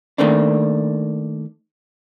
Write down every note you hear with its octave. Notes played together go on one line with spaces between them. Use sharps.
D#3 A3 A#3 C4 D4